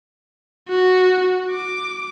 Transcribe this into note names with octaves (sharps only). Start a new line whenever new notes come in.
F#4
D6